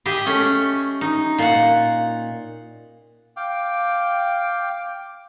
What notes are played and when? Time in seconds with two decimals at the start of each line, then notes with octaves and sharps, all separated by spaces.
0.06 G4 G#4 D#5 E5
0.26 A3 C#4
1.01 D#4
1.38 A#2 F#5
3.37 F5 G5 D6